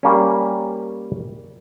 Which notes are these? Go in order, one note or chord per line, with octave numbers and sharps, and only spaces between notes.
G3 A#3 C#4